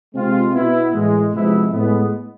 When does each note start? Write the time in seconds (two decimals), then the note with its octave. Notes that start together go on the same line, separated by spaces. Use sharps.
0.14 C3 G#3 C4 F4
0.53 B2 B3 E4
0.93 A2 E3 G#3
1.32 C3 F3 G#3 B3 E4
1.71 A2 G#3 B3